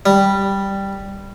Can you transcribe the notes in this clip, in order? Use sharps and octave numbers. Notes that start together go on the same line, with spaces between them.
G3